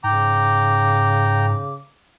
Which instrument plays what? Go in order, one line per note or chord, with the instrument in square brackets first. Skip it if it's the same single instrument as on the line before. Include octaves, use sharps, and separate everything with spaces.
[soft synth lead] G#2 [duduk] C#3 [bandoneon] G5 A#5 [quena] D6